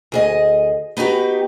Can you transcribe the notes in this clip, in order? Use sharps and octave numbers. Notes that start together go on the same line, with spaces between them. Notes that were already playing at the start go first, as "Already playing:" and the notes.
D2 G#4 D#5
B3 D#4 F#4 G4 B4